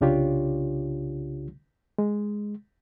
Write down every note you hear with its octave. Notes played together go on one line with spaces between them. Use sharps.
C2 C#3 D4 F4 G4 C#5
G#3